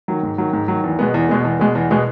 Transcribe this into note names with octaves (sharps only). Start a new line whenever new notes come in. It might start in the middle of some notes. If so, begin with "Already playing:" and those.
D#3 F#3
G#2
D#3 F#3
G#2
D#3 F#3
E2
B2 G#3 B3
E2
B2 G#3 B3
E2
B2 G#3 B3
E2
B2 G#3 B3